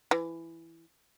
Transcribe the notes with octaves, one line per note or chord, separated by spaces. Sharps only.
E3